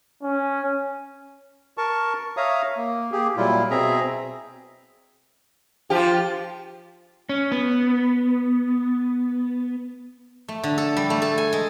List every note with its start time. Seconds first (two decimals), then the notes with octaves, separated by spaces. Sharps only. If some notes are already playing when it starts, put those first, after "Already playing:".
0.23 C#4
1.78 A#4 A5 C#6
2.37 C#5 E5 F5 A#5 D#6
2.77 A#3
3.12 A#3 G4 G#4
3.37 A#2 F#3 G3 E4 F4
3.70 B2 C4 G#4 E5 A#5
5.90 F3 F4 G4
7.29 C#4
7.52 B3
10.48 A3
10.63 D3
10.78 A4
10.97 G3
11.10 A3
11.22 A4
11.38 G#5
11.53 G#3